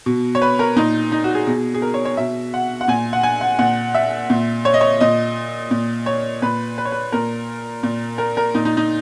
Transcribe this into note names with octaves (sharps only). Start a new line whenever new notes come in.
B2
C#5
B4
A#4
A#2 D#4
D#4
F#4
G#4
B2 G#4
G#4
A#4
C#5
C#5
B2 E5
F#5
F#5
A#2 G#5
F#5
G#5
F#5
A#2 F#5
E5
A#2
C#5
D#5
C#5
A#2 D#5
A#2
C#5
A#2 B4
B4
C#5
B4
A#2 A#4
A#2
A#4
A#4
A#2 D#4
D#4
D#4